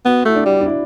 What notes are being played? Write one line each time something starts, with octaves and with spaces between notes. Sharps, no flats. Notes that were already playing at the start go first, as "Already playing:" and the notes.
B3 F#4
A3 E4
D4
G3
D4
E4